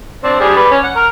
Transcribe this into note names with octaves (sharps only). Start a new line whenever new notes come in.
C4 D4
G3 D4 G#4
B4 D5
C#4
F#5
A#4